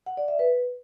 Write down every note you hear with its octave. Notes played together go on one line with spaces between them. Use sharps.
F#5
D5
E5
B4